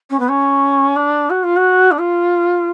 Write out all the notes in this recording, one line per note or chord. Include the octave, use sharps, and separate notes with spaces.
C#4
B3
C#4
D4
F#4
F4
F#4
D4
F4